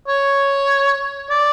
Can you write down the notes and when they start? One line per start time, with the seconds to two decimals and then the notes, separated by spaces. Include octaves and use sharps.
0.08 C#5
1.30 D5